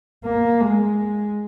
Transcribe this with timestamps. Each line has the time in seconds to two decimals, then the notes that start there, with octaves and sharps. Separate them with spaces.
0.24 A#3
0.61 G#3